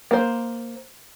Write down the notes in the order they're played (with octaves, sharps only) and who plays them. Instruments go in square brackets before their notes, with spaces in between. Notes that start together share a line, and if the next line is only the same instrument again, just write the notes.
[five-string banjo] A#3 C5